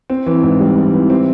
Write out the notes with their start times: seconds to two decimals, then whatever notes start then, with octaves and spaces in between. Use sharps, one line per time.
0.10 C4
0.26 E3
0.43 G#2
0.60 G3
0.77 C4
0.94 E3
1.10 C4